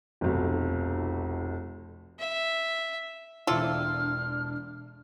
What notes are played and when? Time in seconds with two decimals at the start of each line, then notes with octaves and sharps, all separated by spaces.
0.21 F1 B1
2.19 E5
3.47 E1 C4 D4 E4 F4 A4 C6 F6